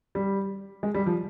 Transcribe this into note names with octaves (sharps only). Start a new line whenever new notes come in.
G3
G#3
G3
F3